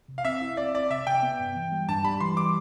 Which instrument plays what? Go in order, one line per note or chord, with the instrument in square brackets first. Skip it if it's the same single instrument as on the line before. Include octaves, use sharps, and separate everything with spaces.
[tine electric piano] C3
[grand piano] F5
[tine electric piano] C4 [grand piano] E5
[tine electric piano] E4
[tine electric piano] C4 [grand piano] D5
[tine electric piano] C4 [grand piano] D5
[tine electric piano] C3 [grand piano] E5
[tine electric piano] C3 [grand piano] G5
[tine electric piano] B3
G2
E3
G3
[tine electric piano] G2 [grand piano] A5
[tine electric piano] G3 [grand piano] B5
[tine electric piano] E3 [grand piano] C6
[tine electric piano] G3 [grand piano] D6